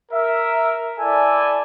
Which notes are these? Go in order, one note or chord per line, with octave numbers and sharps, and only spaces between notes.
A#4 E5
E4 A4 D5 G#5